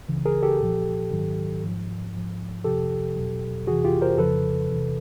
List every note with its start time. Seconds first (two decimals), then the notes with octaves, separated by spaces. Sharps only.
0.09 C#2 C#3 E3
0.26 G#4 A#4
0.43 G4 A4
0.59 C2 A#2 F3
1.11 G#2 D#3 F#3
1.63 G#2 F3
2.14 G#2 F3
2.64 F2 C3 F3 G4 A4
3.16 E2 B2 F#3
3.67 F2 C3 E3 F#4 G#4
3.85 F4 G4
4.02 A#4 C5
4.18 F2 C#3 F3 A4 B4
4.70 E2 C3 E3